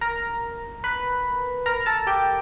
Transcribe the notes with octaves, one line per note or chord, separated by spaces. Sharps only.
A#4 A#5
B4 B5
A#4 A#5
A4 A5
G4 G5